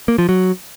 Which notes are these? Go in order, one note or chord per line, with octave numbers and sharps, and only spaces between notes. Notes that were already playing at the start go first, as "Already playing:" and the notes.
A#3
F3
F#3